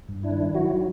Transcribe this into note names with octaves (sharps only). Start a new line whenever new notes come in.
G2
D4 E4
D#3
F#3 E4 F#4